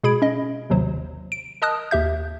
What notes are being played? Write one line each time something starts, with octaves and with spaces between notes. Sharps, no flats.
B2 G#3 G#4 B5 G#6 D7
C#4 D#5
G#1 D#2 C3 F#3 C5
D7
A#4 D#5 A5 D#6 F6 F#6
D#2 G4 E5 G6